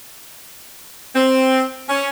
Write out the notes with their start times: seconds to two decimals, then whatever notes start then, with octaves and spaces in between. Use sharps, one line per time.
1.15 C4
1.89 C#4